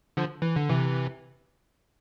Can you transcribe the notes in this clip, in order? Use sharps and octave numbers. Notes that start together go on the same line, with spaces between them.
D3 F3
E3
D3
C3 E3